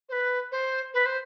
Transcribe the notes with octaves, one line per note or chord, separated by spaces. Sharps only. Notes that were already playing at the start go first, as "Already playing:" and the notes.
C5
B4
C5
B4
C5